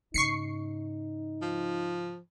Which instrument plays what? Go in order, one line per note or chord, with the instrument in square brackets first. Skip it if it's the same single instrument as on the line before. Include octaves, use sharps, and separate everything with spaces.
[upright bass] G#2 C#3 [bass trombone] D#4 [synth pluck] C#6 C7 C#7
[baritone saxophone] F3